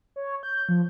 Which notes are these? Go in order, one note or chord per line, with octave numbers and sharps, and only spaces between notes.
C#5
G6
F3